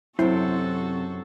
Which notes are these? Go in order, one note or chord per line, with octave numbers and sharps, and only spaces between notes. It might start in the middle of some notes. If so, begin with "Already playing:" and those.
F#2 C3 F#3 C4 E4 F#4 A4 C5